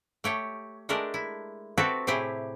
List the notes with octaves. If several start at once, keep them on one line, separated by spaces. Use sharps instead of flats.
A3 G4 C#5
G#3 A3 D4 G4 A#4
E4
C4 F#4 G4 A4 B4 E5
A2 C3 E4 G4 G#4